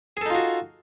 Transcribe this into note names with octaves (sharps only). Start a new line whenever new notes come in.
D#4 F4 F#4 G#4 A4